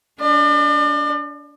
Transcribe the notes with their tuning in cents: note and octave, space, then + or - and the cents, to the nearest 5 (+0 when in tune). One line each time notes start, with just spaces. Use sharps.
D4 -35 D5 +40